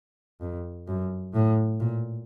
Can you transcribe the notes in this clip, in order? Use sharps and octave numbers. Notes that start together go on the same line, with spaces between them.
F2
F#2
A2
A#2